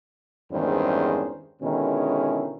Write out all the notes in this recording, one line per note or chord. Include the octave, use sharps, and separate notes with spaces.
E2 G2 D#3 G#3 C#4 C5
B2 D3 D#3 G#3 C#4 E4